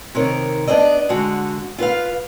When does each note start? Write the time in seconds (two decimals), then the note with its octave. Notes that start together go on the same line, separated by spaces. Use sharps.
0.15 C3 D#3 A#4 C#5
0.67 B3 D4 C5 D5 D#5
1.09 D3 G#3 F#4
1.78 F4 B4 F5